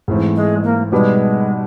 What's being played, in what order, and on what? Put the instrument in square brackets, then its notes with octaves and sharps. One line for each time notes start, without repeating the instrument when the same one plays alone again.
[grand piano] G#2 E3 A3 C4
[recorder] G#3
A#3
[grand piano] B2 G3 B3 D#4 G4 [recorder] G#3